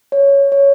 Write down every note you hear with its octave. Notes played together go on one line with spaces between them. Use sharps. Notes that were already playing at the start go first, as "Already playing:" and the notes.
C#5
C#5